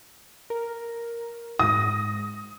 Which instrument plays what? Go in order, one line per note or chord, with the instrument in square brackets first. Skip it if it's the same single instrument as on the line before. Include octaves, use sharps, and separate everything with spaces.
[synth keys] A#4
[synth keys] G#2 A#6 [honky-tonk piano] D#6